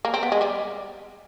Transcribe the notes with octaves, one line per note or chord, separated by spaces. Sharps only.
A#3
C4
B3
G#3
G3